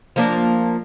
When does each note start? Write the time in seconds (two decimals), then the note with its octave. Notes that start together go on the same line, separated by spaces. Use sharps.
0.16 F3 A#3 D4